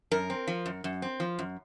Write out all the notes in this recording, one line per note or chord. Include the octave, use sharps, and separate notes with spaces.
F#2 A#4
C4
F3
F#2
F#2
C4
F3
F#2